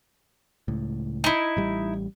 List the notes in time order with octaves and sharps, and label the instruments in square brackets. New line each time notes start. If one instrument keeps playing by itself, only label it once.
[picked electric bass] C#2 A2
[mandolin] D#4 E4
[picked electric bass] A1 G3